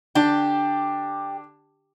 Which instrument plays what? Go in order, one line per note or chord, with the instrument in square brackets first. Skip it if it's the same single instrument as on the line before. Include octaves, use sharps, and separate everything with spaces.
[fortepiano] D3 D4 A5 [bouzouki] G4